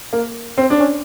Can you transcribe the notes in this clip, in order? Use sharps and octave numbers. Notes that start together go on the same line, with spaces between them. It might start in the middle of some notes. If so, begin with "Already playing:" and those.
A#3
C4
D4
C#4